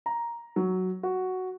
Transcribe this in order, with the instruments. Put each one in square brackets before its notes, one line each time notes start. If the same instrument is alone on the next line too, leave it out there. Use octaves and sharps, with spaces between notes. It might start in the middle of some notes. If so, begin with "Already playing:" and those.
[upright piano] A#5
F#3
F#4